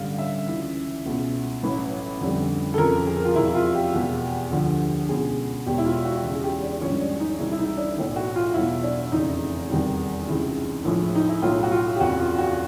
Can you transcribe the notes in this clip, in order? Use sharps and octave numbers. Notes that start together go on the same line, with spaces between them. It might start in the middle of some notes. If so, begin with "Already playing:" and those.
Already playing: A1 G2 D3 G3 F5
E5
C#2 C#3 E3
C#2 B2 G#3
A1 A2 F#3 B4
F2 D3 G3
A4
F2 C#3 F3 A#4
G#4
F4
E2 C3 F3 G#3 E4
F4
G4
E2 B2 G#3
D2 D3 F3
C#2 B2 G#3 G#4
E1 E2 B2 G4
E4
F4
F#4
E2 C#3 E3 G#3
G#4
G4
D4
A#1 G#2 D#3 G3 C#4
D4
D#4
C2 C3 E3 G#3 E4
E4
D#4
D4
B1 A2 E3
F#4
F4
E2 B2 F#3 E4
D4
F1 E2 C#3 E3 D#4
E2 C3 D#3 G3
C#2 C3 E3 G#3
A#1 A2 F3 G#3
D#4
E4
B1 A2 F#3 F4
F#4
F4
G4
F#1 E2 C3 F#4
F4
F#4